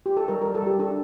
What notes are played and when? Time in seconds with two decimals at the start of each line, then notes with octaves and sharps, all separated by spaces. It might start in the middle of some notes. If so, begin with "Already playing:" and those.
0.06 G4
0.17 A4
0.28 G3 A#4
0.42 G3 A#4
0.54 A4
0.62 G3 G4
0.79 D4 A4